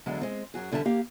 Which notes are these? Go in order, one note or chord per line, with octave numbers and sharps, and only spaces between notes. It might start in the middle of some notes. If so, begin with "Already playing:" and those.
E2 D3 F#3 G#3
G#3 C4
F#2 F#3 F#4 G#4
E2 D3 G3 E5 A5
A#3 G4 F5